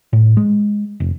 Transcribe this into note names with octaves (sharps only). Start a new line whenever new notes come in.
A2
G#3
F1